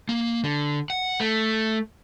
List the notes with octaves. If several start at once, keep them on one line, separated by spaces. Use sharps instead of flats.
A#3
D3
F#5
A3